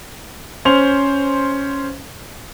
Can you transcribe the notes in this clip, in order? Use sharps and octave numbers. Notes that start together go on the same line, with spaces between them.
C#4 C5 F7